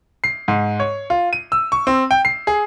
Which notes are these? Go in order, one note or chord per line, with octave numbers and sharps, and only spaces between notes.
C7
G#2
C#5
F4
D#7
E6
C#6
C4
G5
C7
G#4